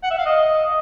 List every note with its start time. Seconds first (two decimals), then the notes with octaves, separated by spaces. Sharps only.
0.03 F#5
0.11 E5
0.18 F5
0.26 D#5